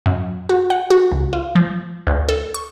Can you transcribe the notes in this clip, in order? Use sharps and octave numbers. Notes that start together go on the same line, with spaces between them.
F#2
F#4
F#5
F#4
C#2
F4
F3
D2
A4
C#6